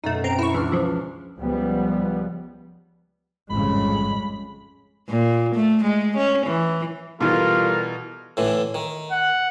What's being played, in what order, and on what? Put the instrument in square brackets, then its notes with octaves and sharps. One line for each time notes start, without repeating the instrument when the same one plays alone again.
[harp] F#2 B2 [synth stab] A3 D#4
[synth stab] C4 A#5 D7
E4 C#6
[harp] C#2 D4 F6 [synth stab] E3
[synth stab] E3 F3
[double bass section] C#2 F3 G3 B3
[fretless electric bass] A1 G#2 [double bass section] F2 C#3 G3 [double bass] G#3 [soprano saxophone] B5
[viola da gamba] A#2
A3
G#3
C#4
E3
[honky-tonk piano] B2 E3 [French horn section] G3 A4 [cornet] F4 [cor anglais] A#4
[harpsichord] A2 D3 E3
D#3
[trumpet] F#5